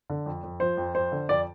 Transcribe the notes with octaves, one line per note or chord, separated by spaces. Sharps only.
D3
F2
F2
F3 C5
F2
F2 C5
D3
F2 D5